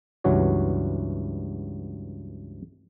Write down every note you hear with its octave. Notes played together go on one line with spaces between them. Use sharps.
C#2 G2 E3 F#3 F#4 C#5